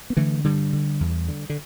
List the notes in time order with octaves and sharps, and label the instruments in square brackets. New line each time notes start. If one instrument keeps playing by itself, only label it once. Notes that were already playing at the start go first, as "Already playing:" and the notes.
[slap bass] B3
D3 E3 A3
G2 D3 G3
D3
E2
D3
D3